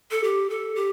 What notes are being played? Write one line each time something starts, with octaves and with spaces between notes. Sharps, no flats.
A4
G4
A4
G4